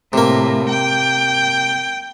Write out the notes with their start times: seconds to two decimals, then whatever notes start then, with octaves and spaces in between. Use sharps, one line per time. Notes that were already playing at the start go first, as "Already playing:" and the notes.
0.13 A2 C3 A#3
0.70 G5